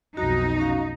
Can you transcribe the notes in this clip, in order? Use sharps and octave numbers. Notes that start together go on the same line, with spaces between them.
B1 F2 D#4 F#4
C#4 F#4 F5